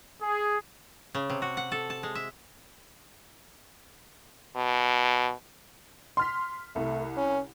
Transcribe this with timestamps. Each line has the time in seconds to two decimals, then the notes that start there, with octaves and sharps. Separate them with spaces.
0.22 G#4
1.15 C#3
1.30 C3
1.42 F#4
1.57 F#5
1.72 A4
1.90 A5
2.03 G#3
2.15 E5
4.56 B2
6.17 C6 F6 B6
6.76 C2 A3
7.17 C#4